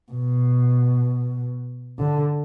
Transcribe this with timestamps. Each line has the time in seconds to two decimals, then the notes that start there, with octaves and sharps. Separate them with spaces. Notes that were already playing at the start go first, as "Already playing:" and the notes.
0.12 B2
1.99 D3